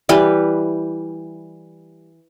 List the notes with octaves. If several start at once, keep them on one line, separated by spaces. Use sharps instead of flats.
E3 G3 B4